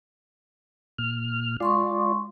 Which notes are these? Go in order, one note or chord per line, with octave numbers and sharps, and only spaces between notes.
A#2 F6
G#3 F4 D5 C6 C#6